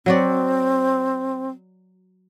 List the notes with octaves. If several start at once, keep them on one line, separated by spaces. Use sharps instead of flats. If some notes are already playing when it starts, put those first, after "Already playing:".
F#3 C4 F#4 D5